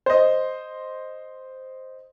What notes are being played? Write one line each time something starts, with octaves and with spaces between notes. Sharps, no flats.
C5 D#5